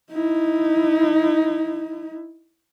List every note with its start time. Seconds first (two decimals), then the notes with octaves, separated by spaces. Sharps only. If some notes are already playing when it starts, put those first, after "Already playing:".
0.12 D#4 E4